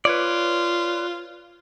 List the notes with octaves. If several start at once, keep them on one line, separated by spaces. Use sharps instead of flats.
F4 B4 C#5 D5